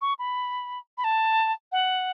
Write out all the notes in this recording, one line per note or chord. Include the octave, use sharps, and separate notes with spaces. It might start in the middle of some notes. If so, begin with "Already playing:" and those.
C#6
B5
B5
A5
F#5